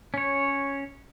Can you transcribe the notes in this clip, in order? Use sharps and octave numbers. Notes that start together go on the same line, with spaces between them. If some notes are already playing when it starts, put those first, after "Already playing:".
C#4 C#5